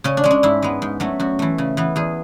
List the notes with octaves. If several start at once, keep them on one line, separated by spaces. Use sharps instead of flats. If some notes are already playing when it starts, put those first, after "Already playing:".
C#3 C#4
D4
G#3 C#4
D4
G#2 E4
G#3 B3
G#2
F#3 A3 C#4
F#2 F#4
E3 A3
C#3
E3 B3
E2 G#4